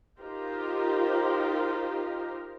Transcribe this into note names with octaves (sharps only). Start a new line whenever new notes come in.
D#4 F4 G4 A#4 C5